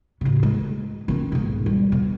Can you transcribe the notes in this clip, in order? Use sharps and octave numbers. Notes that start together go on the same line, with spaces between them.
A2 C#3
G#3
D#3 C#4
B1 G#2
G3
B2